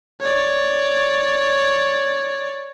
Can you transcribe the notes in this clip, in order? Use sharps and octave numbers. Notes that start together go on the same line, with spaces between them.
C#5 D5